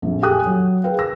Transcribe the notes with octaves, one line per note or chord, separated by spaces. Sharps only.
A#1 F2
G4 A4 G5 G#5 D#6 F#6
F#3
G#4 A#4 B4 F5 G5
E6 A#6